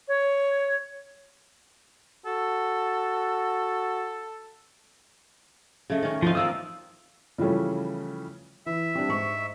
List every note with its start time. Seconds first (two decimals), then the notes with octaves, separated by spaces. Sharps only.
0.08 C#5
2.26 F#4 A4
5.90 C#3 A3 D#5
6.02 D#3 C#4
6.22 E3 F3 C4 D#4 F4
6.35 D#3 A#3 D5 D#6 E6
7.38 C#3 E3 F3 G3 A3 C#4
8.66 E3 E5
8.95 G3 C4 D4
9.08 G#2 C#6